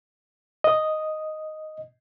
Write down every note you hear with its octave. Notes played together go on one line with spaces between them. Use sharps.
D#5